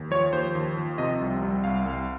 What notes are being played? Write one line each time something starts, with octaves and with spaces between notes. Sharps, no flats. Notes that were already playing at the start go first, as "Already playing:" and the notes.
Already playing: D#2
F3 C#5
D#2 C5
D#2
F3
C3 D#5
C2
G3
C2 F5
C2